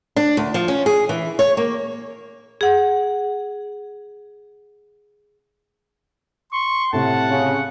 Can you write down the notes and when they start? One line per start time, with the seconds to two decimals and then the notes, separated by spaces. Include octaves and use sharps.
0.16 D4
0.37 D2
0.54 F3
0.68 C#4
0.86 G#4
1.09 E3
1.39 C#5
1.57 A#3
2.61 G#4 F#5
6.53 C6 C#6
6.93 A2 C3 F#5 A5
7.29 C#3